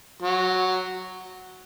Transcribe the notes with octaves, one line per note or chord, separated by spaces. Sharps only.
F#3